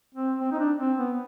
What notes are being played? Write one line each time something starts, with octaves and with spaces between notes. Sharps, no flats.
C4
C4
D#4
D4
C4
B3